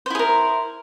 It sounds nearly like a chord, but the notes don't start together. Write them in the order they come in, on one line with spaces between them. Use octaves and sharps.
C5 E4 G#4 A#4